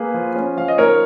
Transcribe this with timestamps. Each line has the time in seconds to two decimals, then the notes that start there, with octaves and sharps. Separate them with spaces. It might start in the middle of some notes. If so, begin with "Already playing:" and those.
Already playing: A#3 G#4 B4
0.14 F3
0.36 C#4
0.57 F3 F5
0.68 D#5
0.78 D#4 A#4 C#5